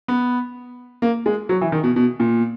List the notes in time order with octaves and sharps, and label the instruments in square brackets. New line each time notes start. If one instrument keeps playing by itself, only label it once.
[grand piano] B3
A#3
G#3
F#3
E3
D#3
B2
B2
A#2